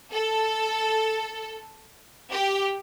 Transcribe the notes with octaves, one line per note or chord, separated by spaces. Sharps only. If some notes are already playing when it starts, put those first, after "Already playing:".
A4
G4